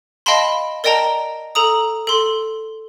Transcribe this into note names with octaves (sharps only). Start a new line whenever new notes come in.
D#5 F5 G5 A5 B5 C6
A#4 D5 D#5 G5 A5 A#5
A4 A#5 D#6
A4 C6